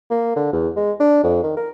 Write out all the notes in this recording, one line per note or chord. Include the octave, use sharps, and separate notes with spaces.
A#3
D3
E2
G#3
D4
F2
D#3
A#4